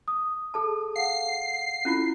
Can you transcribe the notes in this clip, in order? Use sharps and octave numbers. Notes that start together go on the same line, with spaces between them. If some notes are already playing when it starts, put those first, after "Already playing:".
D#6
G#4 A4 A5
F5 F#5 C7
C#4 E4 F4